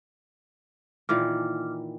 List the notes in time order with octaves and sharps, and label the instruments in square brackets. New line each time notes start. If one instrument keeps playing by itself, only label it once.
[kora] A#2 D#3 E3 [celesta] D6 F6